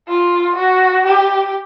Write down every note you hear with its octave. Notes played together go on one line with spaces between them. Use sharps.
F4
F#4
G4